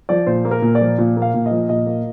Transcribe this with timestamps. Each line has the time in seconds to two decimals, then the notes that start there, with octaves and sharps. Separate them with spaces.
0.09 F3 D5
0.27 A#2 C5
0.45 A#3
0.51 A#4
0.62 A#2
0.75 D5
0.81 F3
0.98 A#2
1.17 A#3
1.22 F5
1.34 A#2
1.46 D#5
1.51 F3
1.69 A#2 D#5
1.86 A#3